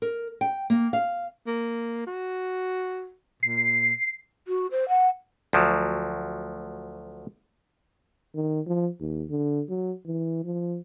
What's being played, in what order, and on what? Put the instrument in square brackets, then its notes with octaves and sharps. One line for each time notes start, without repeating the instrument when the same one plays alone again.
[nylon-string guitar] A#4
G5
A#3
F5
[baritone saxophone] A#3
F#4
[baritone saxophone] A#2 [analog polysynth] C7
[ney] F#4
C5
F#5
[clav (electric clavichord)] D2 F3 F#3
[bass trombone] D#3
F3
D#2
D3
F#3
E3
F3